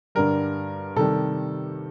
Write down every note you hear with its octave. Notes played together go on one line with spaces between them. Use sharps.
G2 D3 G3 A#4
C3 D#3 G3 A4